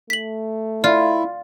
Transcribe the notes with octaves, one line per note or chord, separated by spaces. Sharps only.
A3 B6 F#7
E4 F4 D5